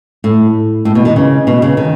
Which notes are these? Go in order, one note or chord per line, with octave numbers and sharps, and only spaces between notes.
A2
A2
B2
D#3
C#3
B2
C#3
D#3